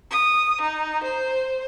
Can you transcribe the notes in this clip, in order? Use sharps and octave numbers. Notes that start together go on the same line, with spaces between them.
D#6
D#4
C5